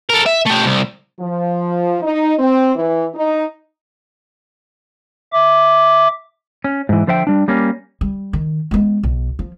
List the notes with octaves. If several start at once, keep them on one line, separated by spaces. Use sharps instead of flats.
A4 A#4
E5
A3 G4
C2
F3
D#4
C4
E3
D#4
E5 D6
C#4
G#2 E3
D3 F3 C5 E5 G5
G3 D4
G3 A#3 C#4
G3
D#3
G#3 B3
B1
F3